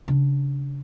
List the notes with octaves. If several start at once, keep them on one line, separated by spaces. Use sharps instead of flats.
C#3 D4